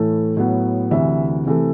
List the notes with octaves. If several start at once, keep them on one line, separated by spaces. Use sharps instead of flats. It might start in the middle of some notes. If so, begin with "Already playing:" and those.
Already playing: A2 E3 A3
A2 F#3 B3
D2 C3 E3 E5
C3 E3 A3